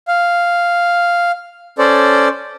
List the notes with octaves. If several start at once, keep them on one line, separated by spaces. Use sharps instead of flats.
F5
C#4 A4 C5 D5